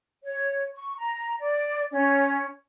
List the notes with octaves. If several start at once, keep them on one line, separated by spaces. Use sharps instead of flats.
C#5
C#6
A#5
D5
C#4